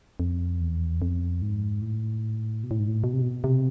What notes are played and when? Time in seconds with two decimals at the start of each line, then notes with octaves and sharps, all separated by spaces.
0.20 F2
0.60 E2
1.02 F2
1.42 G#2
1.82 A2
2.64 B2
2.71 A2
2.79 G#2
2.88 A2
3.04 B2
3.13 C3
3.22 B2
3.44 C3